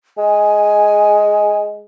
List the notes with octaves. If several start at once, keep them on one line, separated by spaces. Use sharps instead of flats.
G#3 G#5